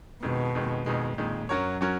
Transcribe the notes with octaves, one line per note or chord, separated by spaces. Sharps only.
F2 B2 D#3 G#3
F2 D#3 G#3
F2 B2 D#3 G#3
F2 A#2 D#3 G#3
F#2 F#3 C#4 F#4 A#4 C#5
F#3 C#4 F#4 A#4 C#5